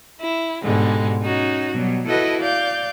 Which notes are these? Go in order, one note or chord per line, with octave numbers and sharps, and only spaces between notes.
E4
G#2 B2 D3 G3 G#3
C#4 D#4 F#4
B2 F#3 G3
E4 F#4 A4 B4 D#5
D5 F5 G6